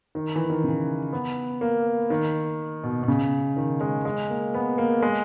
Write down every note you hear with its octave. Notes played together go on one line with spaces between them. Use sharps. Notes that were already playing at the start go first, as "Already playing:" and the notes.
D#3
E3
D#3
C#3
B3
A#3
D#3
B2
B2
C#3
D#3
G#3
G#3
A#3
B3
A#3
G#3